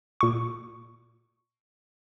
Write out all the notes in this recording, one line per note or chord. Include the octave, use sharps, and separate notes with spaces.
A#2 C#6